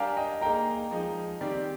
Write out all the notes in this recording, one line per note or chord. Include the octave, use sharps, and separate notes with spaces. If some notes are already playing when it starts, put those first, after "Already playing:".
Already playing: G3 D4 G4 A#4 D5 F5 G#5
D#5 G5
A#3 D#4 G#4 G5 A#5
F3 G#3 D#4
D#3 G3 C4 G4 D5